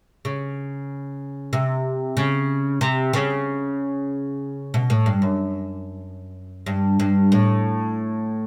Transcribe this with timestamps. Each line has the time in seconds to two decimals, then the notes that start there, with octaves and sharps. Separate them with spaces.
0.25 C#3
1.53 C3
2.17 C#3
2.81 C3
3.13 C#3
4.74 B2
4.90 A2
5.06 G2
5.22 F#2
6.66 G2
7.00 G2
7.32 A2